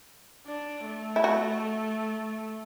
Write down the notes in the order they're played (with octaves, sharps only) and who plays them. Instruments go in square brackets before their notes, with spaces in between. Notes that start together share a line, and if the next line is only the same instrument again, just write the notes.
[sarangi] D4
A3
[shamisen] E4
F#4